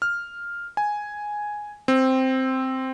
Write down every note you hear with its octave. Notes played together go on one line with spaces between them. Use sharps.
F6
G#5
C4